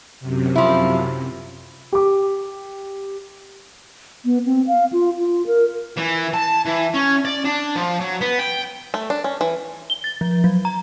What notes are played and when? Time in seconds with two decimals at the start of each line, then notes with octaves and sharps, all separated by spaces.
0.20 F#2 C3
0.56 F3 E4
1.93 G4 D6
4.25 B3
4.46 C4
4.67 F5
4.92 F4
5.19 F4
5.47 A#4
5.97 E3
6.34 A5
6.65 E3
6.94 C#4
7.25 D5
7.45 D4
7.75 F3
8.00 F#3
8.21 B3
8.39 G5
8.94 A3
9.10 D4
9.24 C#4
9.41 E3
9.90 G7
10.04 A6
10.21 F3
10.44 F#3
10.65 A#5